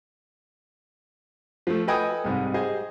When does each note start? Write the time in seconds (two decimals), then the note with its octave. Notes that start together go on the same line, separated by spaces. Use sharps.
1.67 F3 A3
1.87 A4 B4 D#5 G5 G#5 D#6
2.24 C2 G#2 C3
2.54 G4 G#4 C5 D#5